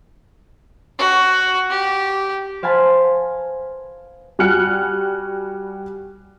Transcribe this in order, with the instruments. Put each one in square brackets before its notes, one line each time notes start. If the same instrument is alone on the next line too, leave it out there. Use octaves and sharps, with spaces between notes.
[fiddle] F#4
G4
[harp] C5 F5 G#5 A5 B5
[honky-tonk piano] G3 F#4 G#5 F6 F#6 C#7